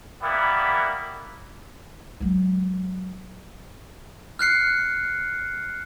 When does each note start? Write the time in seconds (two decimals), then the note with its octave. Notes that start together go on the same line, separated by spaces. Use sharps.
0.22 G3 A#3 B3 E4
2.21 F#3 G#3
4.39 F6 F#6 C7 C#7